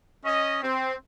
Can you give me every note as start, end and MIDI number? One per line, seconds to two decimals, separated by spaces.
0.25 0.59 61
0.25 0.59 75
0.63 0.93 60